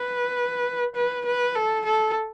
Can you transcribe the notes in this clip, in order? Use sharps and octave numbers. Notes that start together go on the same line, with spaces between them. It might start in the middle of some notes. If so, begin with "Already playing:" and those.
Already playing: B4
B4
B4
A4
A4